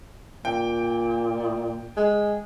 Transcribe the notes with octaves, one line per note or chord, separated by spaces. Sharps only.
A#2 G5
G#3